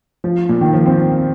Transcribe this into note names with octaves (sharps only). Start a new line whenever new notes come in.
F3
A#2
D#3
F3
C4